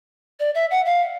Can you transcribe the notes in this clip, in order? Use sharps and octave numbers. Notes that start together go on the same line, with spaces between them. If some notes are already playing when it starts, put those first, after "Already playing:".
D5
E5
F#5
F5